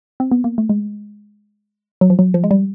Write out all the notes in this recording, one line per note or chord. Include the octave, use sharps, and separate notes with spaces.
C4
B3
A#3
A3
G#3
F#3
F3
F#3
F3
G#3
G3